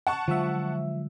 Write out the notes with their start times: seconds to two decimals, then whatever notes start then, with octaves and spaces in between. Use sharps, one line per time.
0.07 F#5 A5 C#6
0.28 D3 F3 F#3 G#3 E5